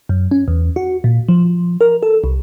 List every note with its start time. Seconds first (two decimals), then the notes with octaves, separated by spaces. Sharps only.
0.09 F#2
0.31 C#4
0.48 E2
0.76 F#4
1.04 A#2
1.28 F3
1.81 A#4
2.03 A4
2.24 C2